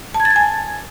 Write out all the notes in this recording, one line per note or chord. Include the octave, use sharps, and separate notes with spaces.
A5
G#6
A6
G#6
G#5